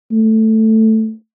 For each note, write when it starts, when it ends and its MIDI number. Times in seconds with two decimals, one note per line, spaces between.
0.12 1.12 57